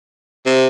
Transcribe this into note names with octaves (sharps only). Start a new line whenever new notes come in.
C3